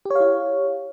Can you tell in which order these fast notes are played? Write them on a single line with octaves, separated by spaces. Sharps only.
G4 C#5 F5 E4